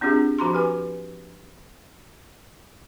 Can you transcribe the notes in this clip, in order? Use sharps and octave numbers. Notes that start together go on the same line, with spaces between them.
C4 D4 F4 G4 G#4
F3 F#4 A#5 C6
G4 B4 G#5